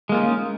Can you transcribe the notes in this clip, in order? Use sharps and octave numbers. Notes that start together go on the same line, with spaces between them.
G#3 A#3 C#4 D#4 F4